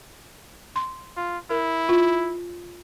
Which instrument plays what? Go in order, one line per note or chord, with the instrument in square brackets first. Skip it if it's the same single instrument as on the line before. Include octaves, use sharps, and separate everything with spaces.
[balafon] C6
[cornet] F4
[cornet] E4 [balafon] A#4
[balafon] F4